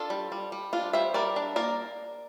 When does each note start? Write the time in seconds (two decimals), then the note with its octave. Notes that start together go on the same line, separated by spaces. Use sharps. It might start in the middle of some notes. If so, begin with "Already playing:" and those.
Already playing: D4 F4 A4
0.10 G3
0.32 G3
0.52 G3
0.73 D4 F4
0.93 G3 C5 E5
1.14 G3 A#4 D5
1.36 D4
1.56 A#3 A#4 D5